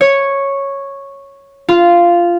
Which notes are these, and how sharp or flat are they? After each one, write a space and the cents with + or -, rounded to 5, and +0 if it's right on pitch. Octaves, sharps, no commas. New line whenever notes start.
C#5 -5
F4 -10